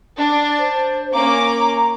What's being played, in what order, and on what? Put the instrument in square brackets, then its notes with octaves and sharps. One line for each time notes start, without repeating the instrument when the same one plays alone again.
[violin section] D4
[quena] C5
[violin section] A#3 C#4 D6 [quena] A#5